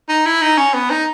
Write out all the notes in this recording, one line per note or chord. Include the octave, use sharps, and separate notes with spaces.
D#4
E4
D#4
C#4
B3
D#4